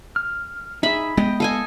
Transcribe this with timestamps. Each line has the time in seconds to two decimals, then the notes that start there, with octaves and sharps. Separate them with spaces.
0.16 F6
0.83 D#4 G#4 E5 B5
1.17 G#3 B3 D#5 G5
1.40 A4 D#5 F5 G#5